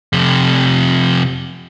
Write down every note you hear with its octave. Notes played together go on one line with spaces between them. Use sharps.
F2 C3